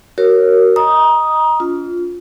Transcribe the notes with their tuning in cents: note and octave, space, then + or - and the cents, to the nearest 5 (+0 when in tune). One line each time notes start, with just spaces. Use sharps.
F#4 +25 A#4 -5 C#5 -10
D#5 +0 A#5 +25 D#6 +0
D4 -45 F4 +0